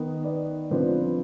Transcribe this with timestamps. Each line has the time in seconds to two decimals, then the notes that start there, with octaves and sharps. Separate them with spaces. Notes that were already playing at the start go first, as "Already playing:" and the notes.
Already playing: D#3 B3
0.24 B4 D5
0.70 D3 F3 C4 B4 D5